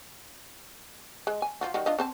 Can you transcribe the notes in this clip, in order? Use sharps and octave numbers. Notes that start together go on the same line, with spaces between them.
G#3
G#5
F3 F4 F#4
D#3 G3 F#4
D4 F4 D#5
C4 C5 A5